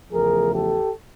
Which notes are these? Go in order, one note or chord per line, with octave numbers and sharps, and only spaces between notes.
E2 C#3 F3 A3 G#4 A#4
G4 A4